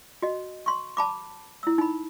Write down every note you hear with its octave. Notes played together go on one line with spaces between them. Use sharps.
F#4 D#5
C6 C#6
A5 B5 D6
E4 E6
D#4 B5